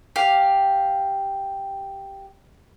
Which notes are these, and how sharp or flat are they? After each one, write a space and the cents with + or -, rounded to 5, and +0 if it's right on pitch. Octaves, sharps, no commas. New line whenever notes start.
G4 +0 F5 +0